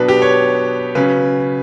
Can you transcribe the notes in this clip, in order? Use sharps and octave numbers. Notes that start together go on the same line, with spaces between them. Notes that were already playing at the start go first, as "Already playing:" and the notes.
Already playing: B2 F#3 B3 D4 B4
G4
C#5
C#3 F#3 C#4 B4